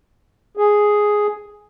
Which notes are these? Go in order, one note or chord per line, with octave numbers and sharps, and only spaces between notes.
G#4